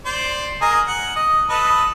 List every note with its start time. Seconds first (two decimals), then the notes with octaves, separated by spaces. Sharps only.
0.06 C5 D5
0.61 G#4 A#4 D#5
0.88 F#5
1.16 D#5
1.50 A4 B4 D#5